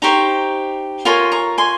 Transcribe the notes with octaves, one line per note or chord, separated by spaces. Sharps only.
D#4 G4 C5 A#5 C#6
F4 A#4 C#5 G#5 C6
A#5 C#6
G#5 C6